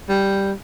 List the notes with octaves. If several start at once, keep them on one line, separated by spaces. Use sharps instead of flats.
G3